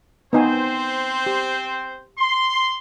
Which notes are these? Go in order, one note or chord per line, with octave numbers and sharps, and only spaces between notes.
B3 C4 D#4 C5 G#5
G4
C6